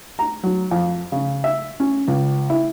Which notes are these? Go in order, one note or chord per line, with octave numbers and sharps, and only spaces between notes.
A#5
F#3
F2
C#3
E5
C#4
C#2
E4